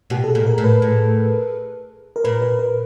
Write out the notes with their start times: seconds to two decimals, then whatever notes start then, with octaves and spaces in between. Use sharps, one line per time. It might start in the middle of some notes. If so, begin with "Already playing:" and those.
0.10 B2 G4
0.24 A4
0.29 G#4
0.35 A#2
0.47 A#4
0.58 A2
0.64 B4
0.82 A2
2.16 A#4
2.24 A#2 B4
2.42 B4
2.59 B4